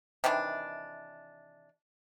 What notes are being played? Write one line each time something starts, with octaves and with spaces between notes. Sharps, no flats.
C3 D#3 E3 D4